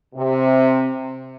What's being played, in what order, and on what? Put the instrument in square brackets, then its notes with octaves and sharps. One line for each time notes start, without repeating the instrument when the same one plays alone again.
[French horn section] C3